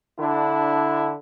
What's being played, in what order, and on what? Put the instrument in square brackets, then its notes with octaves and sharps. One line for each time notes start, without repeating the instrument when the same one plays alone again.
[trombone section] D3 D4 E4